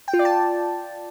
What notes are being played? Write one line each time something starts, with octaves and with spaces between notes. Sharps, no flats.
G5
F4
D5
A5